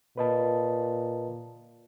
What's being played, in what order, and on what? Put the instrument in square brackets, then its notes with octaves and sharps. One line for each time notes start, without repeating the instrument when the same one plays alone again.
[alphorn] A#2 [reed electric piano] B4 D#5 A5